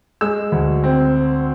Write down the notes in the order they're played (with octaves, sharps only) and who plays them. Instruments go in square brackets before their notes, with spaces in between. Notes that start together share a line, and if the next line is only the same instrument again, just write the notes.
[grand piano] G#3 E6
D2
C4